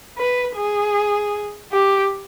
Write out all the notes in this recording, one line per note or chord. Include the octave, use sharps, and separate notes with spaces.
B4
G#4
G4